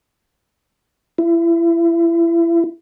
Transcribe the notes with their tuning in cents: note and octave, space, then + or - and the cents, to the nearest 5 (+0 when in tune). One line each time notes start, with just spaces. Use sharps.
E4 +30